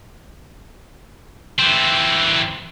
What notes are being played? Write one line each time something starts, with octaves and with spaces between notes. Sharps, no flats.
E3 C4